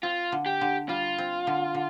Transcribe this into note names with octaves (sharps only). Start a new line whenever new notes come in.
C4 F4
D3
G4
D3
G3 F4
C4
D3
D3